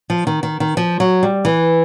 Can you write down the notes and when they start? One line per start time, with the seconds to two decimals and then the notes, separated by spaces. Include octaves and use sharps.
0.10 F3
0.27 D#3
0.43 D#3
0.60 D#3
0.77 F3
1.00 F#3
1.23 G3
1.45 E3